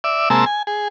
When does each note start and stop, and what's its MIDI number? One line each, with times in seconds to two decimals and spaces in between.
0.04 0.29 74
0.04 0.29 76
0.30 0.45 48
0.30 0.45 56
0.30 0.45 58
0.30 0.45 81
0.30 0.45 88
0.46 0.63 80
0.67 0.88 68